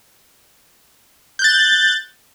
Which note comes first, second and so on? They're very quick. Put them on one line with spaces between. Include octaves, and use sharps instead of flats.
G6 F#6 A6